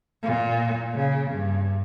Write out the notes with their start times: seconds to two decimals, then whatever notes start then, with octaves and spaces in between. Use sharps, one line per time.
0.23 A#2
0.94 C#3
1.31 G2